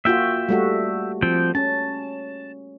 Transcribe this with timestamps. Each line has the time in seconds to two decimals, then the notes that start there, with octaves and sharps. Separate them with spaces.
0.05 A#3 F4 F#4 E5 G5
0.49 G3 A3 F#4
1.22 F3 C4 G5
1.55 C#4 A5